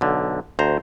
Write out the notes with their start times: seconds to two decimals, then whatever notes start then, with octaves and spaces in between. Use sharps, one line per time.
0.01 B1 D3
0.59 D2 C5 A#5